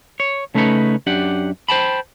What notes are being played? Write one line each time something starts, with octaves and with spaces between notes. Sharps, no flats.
C#5
C#3 A3 C#4 D#4 B4 C#5
F#2 D4 G4 F#5
C5 G5 A5 B5